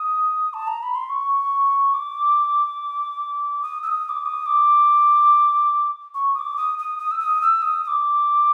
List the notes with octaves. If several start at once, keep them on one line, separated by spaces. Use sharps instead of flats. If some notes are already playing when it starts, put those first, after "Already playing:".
Already playing: D#6
A5
A#5
B5
C6
C#6
D6
D#6
E6
D#6
D#6
D6
D#6
D6
C#6
D#6
D6
D#6
D#6
D#6
E6
D#6
E6
D#6
D#6
D6